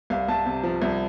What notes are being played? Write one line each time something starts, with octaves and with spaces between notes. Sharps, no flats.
C2 F5
C2 A5
C3
F3
C2